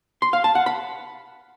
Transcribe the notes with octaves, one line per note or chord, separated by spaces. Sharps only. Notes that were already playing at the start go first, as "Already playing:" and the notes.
C6
F5
A5
F#5
B5